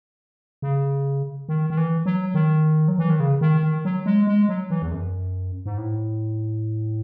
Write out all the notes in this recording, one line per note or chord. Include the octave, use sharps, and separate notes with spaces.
C#3
D#3
D#3
E3
F#3
D#3
F#3
E3
D#3
C#3
D#3
D#3
F#3
G#3
G#3
F#3
E3
E2
F#2
G#2
A2